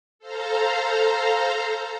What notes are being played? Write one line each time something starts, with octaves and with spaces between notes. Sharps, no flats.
A4 C5 F5 A#5